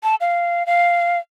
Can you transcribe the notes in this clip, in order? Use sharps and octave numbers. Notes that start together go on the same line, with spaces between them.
A5
F5
F5